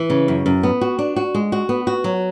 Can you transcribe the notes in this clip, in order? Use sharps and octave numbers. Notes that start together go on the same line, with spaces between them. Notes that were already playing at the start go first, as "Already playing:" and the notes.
Already playing: E3
C#3
F#2
F#2
B3
F#4
D4
F#4
G#3
F#4
B3
F#4
F#3